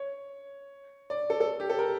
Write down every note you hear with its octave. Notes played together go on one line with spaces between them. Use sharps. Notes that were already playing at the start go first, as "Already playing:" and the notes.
Already playing: C#5
D5
A4
A4
G4
A4
A#4